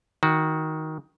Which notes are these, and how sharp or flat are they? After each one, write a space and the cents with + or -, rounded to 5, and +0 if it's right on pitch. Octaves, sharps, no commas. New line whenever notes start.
D#3 +15 F#4 +0